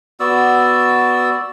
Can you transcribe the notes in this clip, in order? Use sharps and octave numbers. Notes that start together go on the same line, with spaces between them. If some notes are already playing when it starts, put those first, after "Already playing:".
B3 F#4 D5 E6